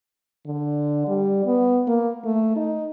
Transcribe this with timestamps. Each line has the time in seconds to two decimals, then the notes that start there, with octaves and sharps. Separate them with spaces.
0.47 D3
1.08 G3
1.46 B3
1.87 A#3
2.24 A3
2.56 D#4